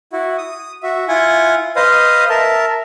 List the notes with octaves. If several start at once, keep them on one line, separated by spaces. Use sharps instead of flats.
E4 F#4
D#6
F#4 E5
E4 F4 F#5 G#5
B4 C5 D#5 F5 D#6
A#4 E5 A5